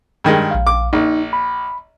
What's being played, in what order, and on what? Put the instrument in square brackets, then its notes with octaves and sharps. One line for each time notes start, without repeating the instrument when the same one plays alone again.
[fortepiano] G2 D#3 G#3
[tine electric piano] A#1 F5
[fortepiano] D6
[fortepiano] A#1 [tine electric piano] D#4
[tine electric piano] B5